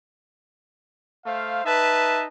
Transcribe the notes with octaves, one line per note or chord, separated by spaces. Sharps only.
A3 C5 F5
D#4 B4 E5 A5